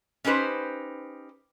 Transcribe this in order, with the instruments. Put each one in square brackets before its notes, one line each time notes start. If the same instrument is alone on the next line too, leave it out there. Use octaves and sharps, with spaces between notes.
[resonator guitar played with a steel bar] C#4 D#4 G4 B4 C5